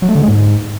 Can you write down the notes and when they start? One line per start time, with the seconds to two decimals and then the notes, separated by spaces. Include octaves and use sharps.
0.02 F#3
0.09 A3
0.15 D3
0.22 G#3
0.28 G#2